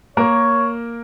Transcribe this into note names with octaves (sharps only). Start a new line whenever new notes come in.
A#3 A#4 C#5